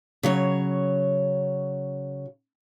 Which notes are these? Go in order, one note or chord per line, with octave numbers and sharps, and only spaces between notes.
C#3 F#3 C#5